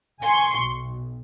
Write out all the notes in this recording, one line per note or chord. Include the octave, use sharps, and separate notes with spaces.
G#5 C6 C#6
B1